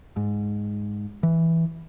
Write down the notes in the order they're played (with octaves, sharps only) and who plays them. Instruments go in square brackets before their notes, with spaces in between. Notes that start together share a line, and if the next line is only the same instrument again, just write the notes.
[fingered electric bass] G#2
E3